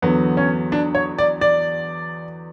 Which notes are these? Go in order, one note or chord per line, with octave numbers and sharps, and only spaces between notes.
E2 D3 F#3 B3
C#4
D4
C#5
D5
D5